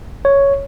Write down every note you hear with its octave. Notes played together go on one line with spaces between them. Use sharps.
C#5